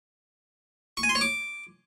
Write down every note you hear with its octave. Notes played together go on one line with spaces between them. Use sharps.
C#6
G#5
C6
C#5
D6